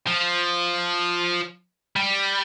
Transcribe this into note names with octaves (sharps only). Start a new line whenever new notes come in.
F3
G3